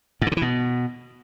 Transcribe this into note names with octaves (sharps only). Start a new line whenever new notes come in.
G#2
D3
C3
E3
B2